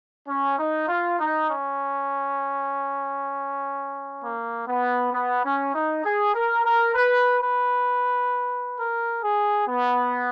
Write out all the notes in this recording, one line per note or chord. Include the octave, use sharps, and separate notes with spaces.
C#4
D#4
F4
D#4
C#4
A#3
B3
B3
C#4
D#4
G#4
A#4
A#4
B4
B4
A#4
G#4
B3